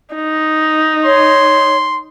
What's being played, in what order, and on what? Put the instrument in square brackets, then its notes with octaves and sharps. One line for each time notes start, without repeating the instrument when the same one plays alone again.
[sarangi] D#4
[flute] C#5 [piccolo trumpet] C6